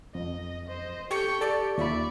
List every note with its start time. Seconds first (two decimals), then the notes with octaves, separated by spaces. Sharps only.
0.15 F2 D#5
0.68 C5 D#5
1.11 G4 A4 G5 C#6
1.41 G4 A4 D5
1.78 D#2 F4 D5 E5 B5 C#6